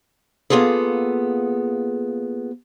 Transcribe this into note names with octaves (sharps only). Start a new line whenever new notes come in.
A#3 B3 F4 G#4 A4